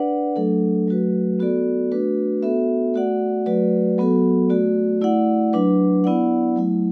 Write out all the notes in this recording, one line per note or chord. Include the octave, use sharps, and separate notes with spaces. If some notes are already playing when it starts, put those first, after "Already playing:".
Already playing: D4 B4 D5 F#5
F#3 A3 D4 A4
F#3 A3 F#4 B4
B3 F#4 A4 D5
A3 D4 F#4 B4
B3 F#4 A4 E5
A3 F#4 D5 F#5
F#3 A3 F#4 B4 D5
F#3 B3 F#4 A4
A3 F#4 D5
A3 E4 D5 F#5
F#3 D4 B4
B3 E4 D5 F#5
F#3 A3 E4